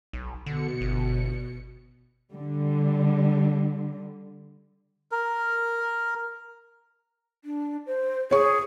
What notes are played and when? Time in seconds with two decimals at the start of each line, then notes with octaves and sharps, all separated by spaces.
0.13 B1
0.46 B2 D3 C#7
0.81 G1
2.32 D3 G3
5.12 A#4
7.45 D4
7.87 C5
8.31 G#4 C#5 C#6